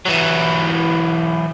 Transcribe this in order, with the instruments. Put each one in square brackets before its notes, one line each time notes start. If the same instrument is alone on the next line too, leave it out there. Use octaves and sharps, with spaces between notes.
[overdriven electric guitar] E3 F#3